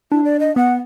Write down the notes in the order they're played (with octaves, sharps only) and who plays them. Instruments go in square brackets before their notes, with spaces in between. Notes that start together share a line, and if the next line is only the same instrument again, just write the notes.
[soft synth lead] D4 [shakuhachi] E4
[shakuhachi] D5
D#5
[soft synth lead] B3 [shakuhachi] F#5